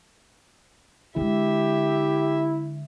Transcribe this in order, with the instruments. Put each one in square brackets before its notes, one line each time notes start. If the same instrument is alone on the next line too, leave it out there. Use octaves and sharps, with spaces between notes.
[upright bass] D3 G#3 [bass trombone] E4 [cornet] G4 [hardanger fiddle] E5